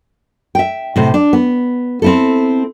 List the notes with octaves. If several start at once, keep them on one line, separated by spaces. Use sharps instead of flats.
E5 G5
A2 C3 C5
D4
B3
C4 E4 A4